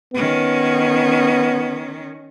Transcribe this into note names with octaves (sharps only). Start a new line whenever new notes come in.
D#3 B3 C#4